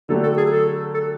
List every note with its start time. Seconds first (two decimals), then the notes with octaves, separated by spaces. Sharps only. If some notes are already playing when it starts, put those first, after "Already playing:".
0.09 D3 F#3 A3 D4 G4 A4
0.23 A4
0.37 G#4
0.51 A4
0.94 A4